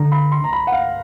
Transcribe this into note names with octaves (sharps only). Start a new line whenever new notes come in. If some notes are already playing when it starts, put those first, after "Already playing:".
Already playing: D3 A#5
B5
C6
A#5
B5
F#5
F5